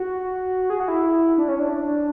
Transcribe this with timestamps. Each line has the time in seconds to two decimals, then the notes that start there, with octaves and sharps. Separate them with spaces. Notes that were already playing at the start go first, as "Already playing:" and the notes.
Already playing: F#4
0.70 G#4
0.80 F#4
0.88 E4
1.38 D4
1.48 C#4
1.59 D4